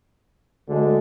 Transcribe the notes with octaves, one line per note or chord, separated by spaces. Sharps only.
D2 D3 G#3